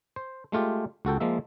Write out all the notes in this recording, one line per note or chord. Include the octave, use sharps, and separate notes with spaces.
C5
G#3 A3 F4 G4
C#2 F#4 A4 G5
F3 G#3 A#3 E5